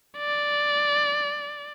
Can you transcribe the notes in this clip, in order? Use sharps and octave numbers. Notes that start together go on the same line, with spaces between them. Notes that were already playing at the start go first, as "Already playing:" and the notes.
D5